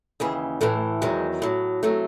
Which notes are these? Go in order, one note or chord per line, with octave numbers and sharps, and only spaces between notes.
D#2 C#3 E3 G#4
A2 E3 A3
E2 D#3 F#3 G#3
A2 F#3
C3 F#3 A3